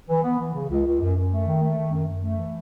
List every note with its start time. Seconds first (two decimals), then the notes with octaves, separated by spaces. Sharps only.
0.08 E3
0.23 B3
0.39 E3
0.54 C#3
0.69 C#2
0.85 C#2
1.00 F#2
1.16 F#2
1.31 A3
1.46 D#3
1.62 A3
1.77 D#3
1.92 F#2
2.07 F#2
2.23 A3
2.38 E3